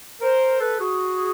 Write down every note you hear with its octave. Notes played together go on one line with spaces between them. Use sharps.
A#4 C5
A4 B4
F#4 G#4